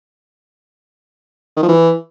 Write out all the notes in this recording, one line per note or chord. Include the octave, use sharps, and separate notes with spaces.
D#3
F3
E3